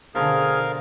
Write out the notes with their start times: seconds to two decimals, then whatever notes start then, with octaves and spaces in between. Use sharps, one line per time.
0.15 B2 D3 F3 G#4 A#4 F5